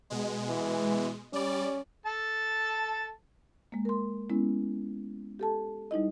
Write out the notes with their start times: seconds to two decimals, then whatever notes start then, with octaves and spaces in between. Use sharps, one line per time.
0.10 B2 G#3
0.49 E3
1.33 G3 C#4 D5
2.06 A4 A5
3.72 G#3 A#3
3.85 A#4 C6
4.30 G#3 B3 C#4 E4
5.39 G4 A4 A5
5.91 G3 D#4 E4 D#5